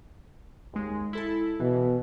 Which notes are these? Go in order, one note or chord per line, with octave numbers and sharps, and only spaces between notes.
D#2 G#3
E4 A4 A5
B2 E3